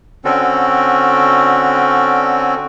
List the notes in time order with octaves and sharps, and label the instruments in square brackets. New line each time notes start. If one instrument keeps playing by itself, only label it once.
[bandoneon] D3 C4 C#4 F#4 A4